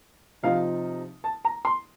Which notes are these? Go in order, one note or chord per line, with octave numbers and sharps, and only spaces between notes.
C3 F3 C4 D#4 F5
A5
A#5
C6